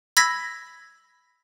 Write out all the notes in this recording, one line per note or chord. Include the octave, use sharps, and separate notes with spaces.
B5 E6 G#6 A#6 B6